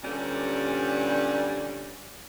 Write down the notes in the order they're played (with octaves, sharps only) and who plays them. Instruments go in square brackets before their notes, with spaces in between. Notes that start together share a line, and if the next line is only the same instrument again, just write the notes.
[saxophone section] G2 A#2 D3 G3 C#4 D4